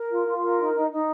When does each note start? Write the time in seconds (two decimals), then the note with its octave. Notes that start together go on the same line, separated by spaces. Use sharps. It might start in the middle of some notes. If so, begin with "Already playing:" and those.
Already playing: A#4
0.10 F4
0.26 F4
0.41 A#4
0.58 D#4
0.74 D#4
0.90 D#4